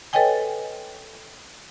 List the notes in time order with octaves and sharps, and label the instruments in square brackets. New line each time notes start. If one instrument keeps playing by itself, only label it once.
[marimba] A4 B4 C#5 D#5 G5 G#5